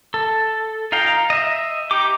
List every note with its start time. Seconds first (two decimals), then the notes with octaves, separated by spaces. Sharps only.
0.14 A4
0.92 D#4 F4 F5 G5 A#5
1.30 D#5 E5
1.91 D#4 G4 G5 D6